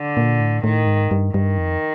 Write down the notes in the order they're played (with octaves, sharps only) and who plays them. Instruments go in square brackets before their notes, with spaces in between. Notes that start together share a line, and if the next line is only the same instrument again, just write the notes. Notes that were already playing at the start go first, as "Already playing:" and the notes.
Already playing: [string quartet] D3
[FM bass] A#2
A2
[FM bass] A2 [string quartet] D#3
[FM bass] G#2
G2
[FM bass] G2 [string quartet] D#3
[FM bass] F2